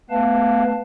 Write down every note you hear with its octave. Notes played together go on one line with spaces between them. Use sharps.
A3 B3 B4 F5 A5